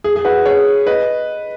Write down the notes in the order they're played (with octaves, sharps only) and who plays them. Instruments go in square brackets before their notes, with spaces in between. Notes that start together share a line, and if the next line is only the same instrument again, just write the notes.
[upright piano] G#4
G#4
F#4 B4
G#4 C#5
B4 D#5